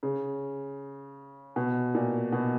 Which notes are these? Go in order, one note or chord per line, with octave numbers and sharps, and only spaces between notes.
C#3
B2
A#2
B2